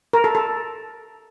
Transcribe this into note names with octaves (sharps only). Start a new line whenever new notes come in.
A#4
A4
A4